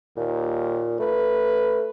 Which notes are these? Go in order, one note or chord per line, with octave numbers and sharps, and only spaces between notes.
D#2 A#2
A3 B4